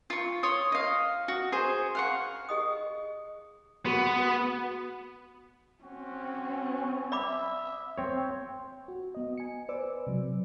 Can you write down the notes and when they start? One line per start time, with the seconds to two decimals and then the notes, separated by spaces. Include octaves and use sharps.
0.10 F4 C#6
0.43 C#5 C6 D#6
0.72 D#5 F5
1.28 F#4
1.52 G#4 C5
1.95 F5 F#5 C#6
2.49 G#4 D#5 D#6
3.85 B3 F#4 G#4
4.17 F#4
5.83 C4 C#4 F#4
7.12 D5 E5 B5 D6
7.98 C4 C5 C#5
8.88 F#4
9.15 B3 D#5
9.37 G#5 C#7
9.69 B4 C5 D5 D6 E6
10.07 C3 F#3